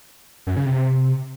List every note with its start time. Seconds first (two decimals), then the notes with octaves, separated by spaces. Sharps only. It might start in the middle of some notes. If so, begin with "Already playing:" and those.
0.47 F#2
0.56 C#3
0.66 C3